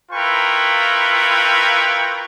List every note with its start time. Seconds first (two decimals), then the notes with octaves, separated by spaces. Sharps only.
0.12 E4 F4 A#4 B4 G5 C#6